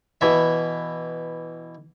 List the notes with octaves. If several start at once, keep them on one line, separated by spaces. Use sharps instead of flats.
B2 E3 E5